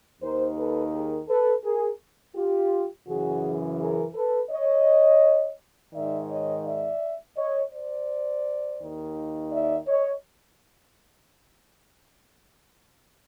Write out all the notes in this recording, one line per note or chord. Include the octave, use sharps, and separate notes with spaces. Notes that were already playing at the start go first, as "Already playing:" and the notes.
D#2 D#3 A#4 C5
A4 B4
G#4 A#4
A4 B4
G#4 A#4
F4 G4
F#2 C#3 E3 F#4 G#4
G#4 A#4
A4 B4
C#5 D#5
G#2 D#3 D5 E5
C#5 D#5
D5 E5
C#5 D#5
C5 D5
D#2 D#3
D5 E5
C#5 D#5